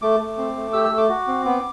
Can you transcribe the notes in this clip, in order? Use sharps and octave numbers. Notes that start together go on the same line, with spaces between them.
A3 D6
A3
C4
A3
G4 E6
E6
A3
D6
F#4
C4
B3